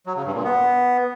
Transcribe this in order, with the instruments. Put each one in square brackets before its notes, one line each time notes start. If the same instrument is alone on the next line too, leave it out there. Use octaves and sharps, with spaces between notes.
[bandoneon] F#3
C#3
G2
A#2
B3